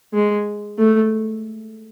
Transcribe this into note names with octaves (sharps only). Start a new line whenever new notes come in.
G#3
A3